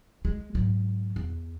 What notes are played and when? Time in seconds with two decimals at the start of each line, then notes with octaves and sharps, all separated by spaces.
0.25 G#3
0.55 G#2 F#3
1.16 E2